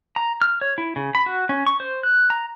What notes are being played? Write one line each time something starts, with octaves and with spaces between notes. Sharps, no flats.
A#5
F6
C#5
E4
C#3
B5
F#4
C#4
C#6
C5
F#6
A#5